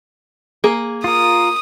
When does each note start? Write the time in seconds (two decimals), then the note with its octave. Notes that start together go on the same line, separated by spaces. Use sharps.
0.64 A#3 G#4
1.04 F4 A#4 D#6